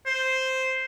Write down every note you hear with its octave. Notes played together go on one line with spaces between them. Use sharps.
C5